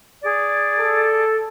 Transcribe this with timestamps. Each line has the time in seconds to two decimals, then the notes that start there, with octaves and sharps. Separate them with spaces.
0.23 G#4 D5
0.79 A4